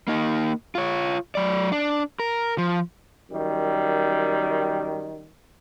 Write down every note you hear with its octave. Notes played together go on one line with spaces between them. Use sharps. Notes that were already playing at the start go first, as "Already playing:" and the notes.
A#3 D#4
F4 C#5
F#3 D5
D4
A#4
F3
F#2 D#3 G3